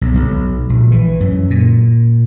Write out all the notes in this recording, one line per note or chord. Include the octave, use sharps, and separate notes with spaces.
B1
B1
A#1
E3
F#2
A#2